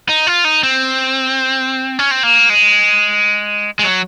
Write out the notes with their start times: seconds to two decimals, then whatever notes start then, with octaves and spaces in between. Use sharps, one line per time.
0.09 D#4
0.27 F4
0.45 D#4
0.63 C4
1.99 C#4
2.11 C4
2.23 A#3
2.50 G#3
3.79 G#3
3.83 F#3